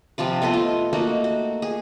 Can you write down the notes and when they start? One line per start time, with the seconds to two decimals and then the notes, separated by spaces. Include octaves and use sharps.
0.18 C3 F3 F4 B4
0.42 A3 B3 F4 D#5
0.53 F4
0.93 A3 A#3 D#4 F#4
1.24 F#4
1.62 G#4